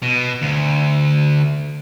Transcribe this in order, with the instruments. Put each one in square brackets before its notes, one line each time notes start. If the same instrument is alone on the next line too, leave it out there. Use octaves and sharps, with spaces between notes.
[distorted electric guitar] B2
D2